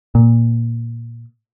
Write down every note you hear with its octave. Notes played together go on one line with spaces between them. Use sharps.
A#2